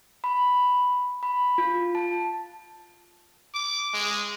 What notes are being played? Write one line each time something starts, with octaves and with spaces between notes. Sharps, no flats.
B5
B5
F4
A5
D6
G#3